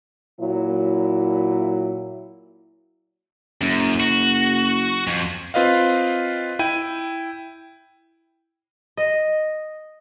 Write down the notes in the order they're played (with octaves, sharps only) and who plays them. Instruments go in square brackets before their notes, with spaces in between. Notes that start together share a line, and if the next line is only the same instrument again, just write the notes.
[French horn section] A#2 F#3 E4
[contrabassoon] F#1 [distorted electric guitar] F#2
[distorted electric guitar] F#4
F2
[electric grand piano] C4 F4 B4 D#5 F5
E4 G5 D#7
[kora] D#5